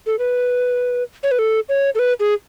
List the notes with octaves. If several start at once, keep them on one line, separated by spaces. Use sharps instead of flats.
A4
B4
C#5
B4
A4
C#5
A4
B4
G#4